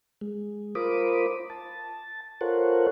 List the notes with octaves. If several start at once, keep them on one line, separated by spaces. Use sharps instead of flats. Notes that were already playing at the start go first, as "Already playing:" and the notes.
G#3
F4 A#4 C5 B5 D6 D#6
A5
F4 A4 A#4 C5 C#5 F#5